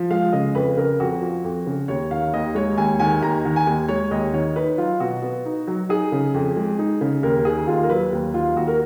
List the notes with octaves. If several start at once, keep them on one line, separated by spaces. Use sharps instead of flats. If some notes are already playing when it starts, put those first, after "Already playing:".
Already playing: F3
G#3 F5
C#3 D#5
F2 B4
C#3 A#4
F2 F#4
F3
F2
C#3
D#2 C#5
D#3 F5
D#2 D#5
G#3 C#5
D#2 G#5
D#3 G#5
D#2 A#5
D#3
G#5
D#2
G#3 C#5
D#2 D#5
D#3 C#5
D#4 B4
F#3 F4
B2 F#4
B3
D#4
F#3
D#4 G#4
C#3
F2
G#3
D#4
C#3
D#2 A#4
D#3 G#4
D#2 F4
A#4
F#3 B4
D#2
D#3 F4
D#2 F#4
A#4